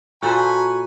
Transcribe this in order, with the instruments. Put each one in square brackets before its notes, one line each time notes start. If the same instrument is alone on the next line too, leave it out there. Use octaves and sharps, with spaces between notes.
[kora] A#2 A4 C5 [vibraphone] F#4 A#5 [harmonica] G#5 B5 [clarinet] C#6